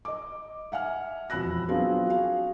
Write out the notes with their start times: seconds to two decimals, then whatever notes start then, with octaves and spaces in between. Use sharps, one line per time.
0.05 D#5 D6
0.72 E5 F#5 G#5 F6
1.30 E1 F2 B5 E6 F#6 A#6
1.68 F#3 B3 C4 D4 F4 G#4
2.09 F#4 G#4 F5